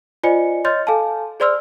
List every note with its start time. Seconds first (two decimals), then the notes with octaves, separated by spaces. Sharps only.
0.23 F4 C5 D5 D#5 G#5 C#7
0.65 C#5 D#5 C6 F6 G6 A6
0.87 A4 F5 G#5 A5
1.40 G#4 C5 D5 C6 E6 F6